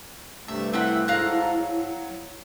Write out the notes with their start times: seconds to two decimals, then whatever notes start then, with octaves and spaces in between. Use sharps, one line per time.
0.48 G2 C3 A3 E5
0.73 C4 E4 F#5 B5
1.08 G#2 F#3 A4 F5 A#5 F#6
1.57 F#3